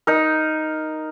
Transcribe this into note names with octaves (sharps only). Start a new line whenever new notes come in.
D#4 A#4